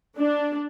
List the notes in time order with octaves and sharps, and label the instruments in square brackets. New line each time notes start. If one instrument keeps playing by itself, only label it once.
[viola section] D4